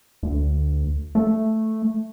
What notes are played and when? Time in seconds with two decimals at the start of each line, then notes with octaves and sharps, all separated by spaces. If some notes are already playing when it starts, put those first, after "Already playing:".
0.23 D2
1.15 A3